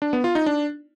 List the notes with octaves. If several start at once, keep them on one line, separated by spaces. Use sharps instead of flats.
D4
B3
F4
D#4
D4